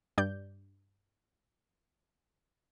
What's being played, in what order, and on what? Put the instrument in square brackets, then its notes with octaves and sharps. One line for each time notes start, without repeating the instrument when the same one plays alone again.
[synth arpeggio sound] G2 D5 G6